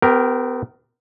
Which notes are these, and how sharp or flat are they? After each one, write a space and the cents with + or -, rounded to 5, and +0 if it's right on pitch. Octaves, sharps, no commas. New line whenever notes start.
B3 +40 G4 +0 A#4 +0